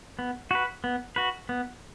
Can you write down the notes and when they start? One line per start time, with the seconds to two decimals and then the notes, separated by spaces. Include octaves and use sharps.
0.19 B3
0.51 F#4 B4
0.84 B3
1.16 F#4 B4
1.49 B3